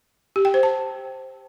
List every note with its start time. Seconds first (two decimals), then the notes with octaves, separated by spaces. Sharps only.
0.36 G4
0.45 G5
0.54 C5
0.63 A5